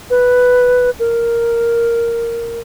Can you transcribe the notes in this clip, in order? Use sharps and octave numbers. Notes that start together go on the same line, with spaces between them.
B4
A#4